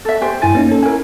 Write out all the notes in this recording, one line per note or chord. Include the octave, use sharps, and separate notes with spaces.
A4 E5
G4 C5 G#5
G2 E4 G#5 A6
A#3 C#4 D#4
C#4 A4
E4 A#4 G#5